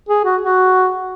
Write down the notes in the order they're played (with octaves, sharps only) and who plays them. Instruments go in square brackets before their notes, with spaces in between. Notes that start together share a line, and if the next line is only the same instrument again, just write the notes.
[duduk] G#4
F#4
F#4